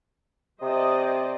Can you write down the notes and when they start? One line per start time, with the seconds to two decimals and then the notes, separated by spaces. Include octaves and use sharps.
0.62 C3 C5 D5 D#5